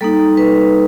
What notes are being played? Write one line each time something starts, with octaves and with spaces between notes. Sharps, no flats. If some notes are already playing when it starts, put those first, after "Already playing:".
G3 A#3 D#4 A4
B4